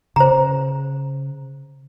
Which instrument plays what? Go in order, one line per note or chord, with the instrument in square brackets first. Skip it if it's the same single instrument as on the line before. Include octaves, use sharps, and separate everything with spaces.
[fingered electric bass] C#3 [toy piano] C5 A#5